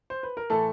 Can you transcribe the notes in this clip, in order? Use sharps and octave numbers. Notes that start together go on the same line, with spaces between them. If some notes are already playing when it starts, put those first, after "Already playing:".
C5
B4
A#4
A2 E3 A3 A4